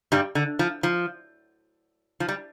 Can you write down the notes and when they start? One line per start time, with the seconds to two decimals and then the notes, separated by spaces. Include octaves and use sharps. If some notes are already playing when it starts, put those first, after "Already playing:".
0.12 G2 G3
0.35 D3
0.59 F3
0.83 F3
2.20 F3
2.29 G3